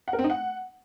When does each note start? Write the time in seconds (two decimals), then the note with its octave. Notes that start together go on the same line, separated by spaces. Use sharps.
0.08 F#5
0.13 A#4
0.19 C4
0.24 D#4
0.30 F#5